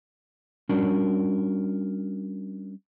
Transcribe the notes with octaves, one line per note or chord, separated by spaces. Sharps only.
G3 C#4 D4 F#4 A#4